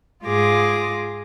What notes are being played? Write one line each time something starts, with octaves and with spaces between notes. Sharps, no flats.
G#2 F4 G#4 D6 A#6